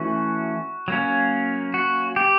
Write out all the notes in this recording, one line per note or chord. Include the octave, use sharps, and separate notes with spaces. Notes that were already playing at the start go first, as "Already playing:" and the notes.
Already playing: E3 A3 C#4 F#4
F#3 A#3 C#4
F#4
G4